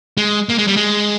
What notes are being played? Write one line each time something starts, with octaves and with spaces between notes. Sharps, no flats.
G#3
A#3
G#3
G3
G#3